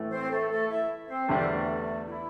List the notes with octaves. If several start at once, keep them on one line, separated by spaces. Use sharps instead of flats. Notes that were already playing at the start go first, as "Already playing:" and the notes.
Already playing: A2 E3 A3
C4 C5
A3 A4
A3 A4
E4 E5
C4 C5
E2 D3 G3 A4
C5
A3 A4
E4